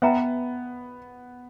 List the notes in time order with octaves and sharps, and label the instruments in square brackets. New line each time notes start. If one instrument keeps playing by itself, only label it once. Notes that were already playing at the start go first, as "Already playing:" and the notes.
[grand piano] B3 [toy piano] B4 E5 G5 A#5